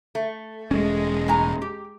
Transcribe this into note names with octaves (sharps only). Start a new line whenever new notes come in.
A3
E1 G#3 C#4
A2 G#5 A#5
G4